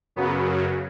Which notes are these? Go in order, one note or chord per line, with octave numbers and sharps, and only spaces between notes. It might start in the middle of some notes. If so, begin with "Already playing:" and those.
F#2 C#3 F#3 B3